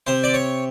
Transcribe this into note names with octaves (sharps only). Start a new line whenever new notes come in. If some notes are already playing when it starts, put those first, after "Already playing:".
C3 C5
D5
C#5